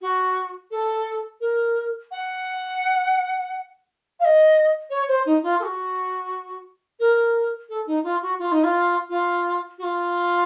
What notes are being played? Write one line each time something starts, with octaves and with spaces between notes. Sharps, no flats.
F#4
A4
A#4
F#5
F5
D#5
C#5
C5
D#4
F4
A4
F#4
A#4
A4
D#4
F4
F#4
F4
D#4
F4
F4
F#4
F4